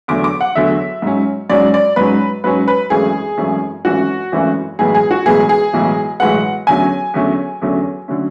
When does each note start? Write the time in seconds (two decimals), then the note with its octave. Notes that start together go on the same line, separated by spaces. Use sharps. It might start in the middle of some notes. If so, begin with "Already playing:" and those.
0.08 E2 D3 F#3 A3 D6
0.24 D6
0.41 F#5
0.55 E2 D3 F#3 A3 E5
1.02 G#2 F#3 C#4
1.50 G#2 F#3 C#4 D5
1.74 D5
1.96 G#2 F#3 C#4 B4
2.44 G#2 F#3 C#4 B4
2.68 B4
2.90 G#1 F#2 E3 A3 C#4 G#4
3.37 G#1 F#2 E3 A3 C#4
3.85 G#1 F#2 E3 A3 C#4 F#4
4.32 G#1 F#2 E3 A3 C#4
4.79 B1 A2 E3 G#3 B3 G#4
4.95 G#4
5.11 F#4
5.25 B1 A2 E3 G#3 B3 G#4
5.49 G#4
5.73 B1 A2 E3 G#3 B3
6.20 B1 A2 E3 G#3 B3 F#5
6.67 E2 D3 F#3 A3 C#4 G#5
7.14 E2 D3 F#3 A3 C#4
7.62 E2 D3 F#3 A3 C#4
8.08 D3 F#3 A3 C#4